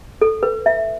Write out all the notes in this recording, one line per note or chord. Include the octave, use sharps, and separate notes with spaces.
A4
B4
E5